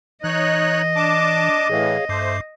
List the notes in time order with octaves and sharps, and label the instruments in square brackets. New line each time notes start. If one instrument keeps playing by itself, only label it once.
[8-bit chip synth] E3 [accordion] D#4 C#5 F#6 [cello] D#5
[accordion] D4 A5 D6
[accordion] A2 E3 [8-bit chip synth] G#4 C#5 F5
[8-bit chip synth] G2 D6 C7 [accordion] A3 C5